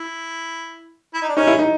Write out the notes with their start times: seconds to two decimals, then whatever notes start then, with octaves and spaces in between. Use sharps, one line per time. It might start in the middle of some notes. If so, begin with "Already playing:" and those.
Already playing: E4
1.14 E4
1.22 D#4
1.28 D4
1.36 C#4 D#4
1.47 E4
1.59 D#4